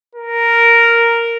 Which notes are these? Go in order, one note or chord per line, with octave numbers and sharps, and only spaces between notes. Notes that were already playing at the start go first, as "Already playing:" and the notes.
A#4